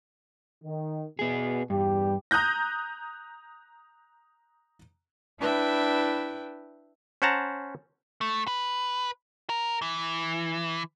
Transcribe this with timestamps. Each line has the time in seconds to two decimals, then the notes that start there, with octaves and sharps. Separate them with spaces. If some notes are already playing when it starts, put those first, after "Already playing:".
0.63 D#3
1.19 B2 B3 G#4
1.70 E2 G2 G3 G4
2.31 A#5 D#6 F#6 G6 A#6
5.40 D4 E4 B4 E5 G5
7.22 C#4 C5 F#5 A5 A#5
8.21 A3
8.47 B4
9.49 A#4
9.82 E3